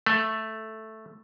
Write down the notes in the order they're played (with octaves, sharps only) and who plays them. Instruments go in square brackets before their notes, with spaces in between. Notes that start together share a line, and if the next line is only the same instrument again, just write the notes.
[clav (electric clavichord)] A3